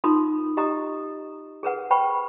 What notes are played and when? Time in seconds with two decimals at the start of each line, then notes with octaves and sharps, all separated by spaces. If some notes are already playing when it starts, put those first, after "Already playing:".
0.04 D#4 F4 A#4 C6 D#6
0.57 G4 D#5 A#5 D#6
1.63 G#4 A#4 B4 F#5
1.90 B4 C5 G5 B5 C#6